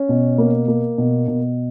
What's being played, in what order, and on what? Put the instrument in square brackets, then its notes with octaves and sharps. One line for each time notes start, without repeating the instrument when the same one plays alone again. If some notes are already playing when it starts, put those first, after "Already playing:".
Already playing: [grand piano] C#4
B2
A#3
A#3
B2
B2